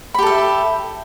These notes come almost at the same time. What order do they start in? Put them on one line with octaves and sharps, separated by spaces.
B5 G4 A4 E5